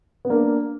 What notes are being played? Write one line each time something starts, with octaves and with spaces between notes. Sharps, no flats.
B3
A#3 D4